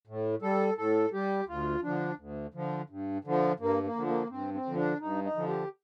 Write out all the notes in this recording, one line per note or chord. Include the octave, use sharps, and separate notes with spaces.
A2
G3 A4
A2 A4
G3 G4
D2 F4
D3 F3 D4
D2
D3 F3
G2
D3 F3
G2 A#3
A#3
D3 F3
A#3
G2 C4
C4
D3 F3
D4
G2 D#4
D#4
D3 F3
G4